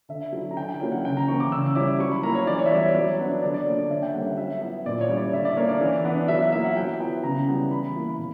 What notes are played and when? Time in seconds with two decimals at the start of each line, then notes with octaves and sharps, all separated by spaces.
0.09 D3 E5
0.32 F#3 C#4 E4
0.51 A#5
0.57 D3 G5
0.69 G5
0.80 F#3 A#3 C#4 E4 G5
0.92 F#5
1.05 C#3 G5
1.17 A#5
1.28 E3 A#3 C#6
1.40 D6
1.52 C#3 E6
1.75 G3 C#4 E4 D6
2.00 F#3 C#6
2.12 B5
2.23 A#3 E4 A#5
2.35 C#5
2.47 E3 D5
2.59 C#5
2.66 E5
2.71 G3 B3 D5
2.83 C#5
2.95 F#3
3.19 B3 D4
3.42 D3 D5
3.54 D5
3.66 A#3 D4 C#5
3.79 D5
3.90 D3 E5
4.03 G5
4.14 G3 A#3 C#4 F#5
4.27 E5
4.37 F#3 E5
4.61 B3 E4
4.86 A#2 D5
5.01 C#5
5.09 G3 C#4 E4
5.17 D5
5.33 D3 E5
5.45 D5
5.57 A#3 D4 C#5
5.69 D5
5.81 E3
6.05 B3 D4
6.28 F#3 E5
6.40 E5
6.52 A#3 E4 E5
6.65 F#5
6.77 F#3 G5
7.00 B3 E4 G5
7.23 C#3 A#5
7.47 G3 B3 E4
7.71 E3 B5
7.95 A#3 E4
8.09 B5
8.18 B2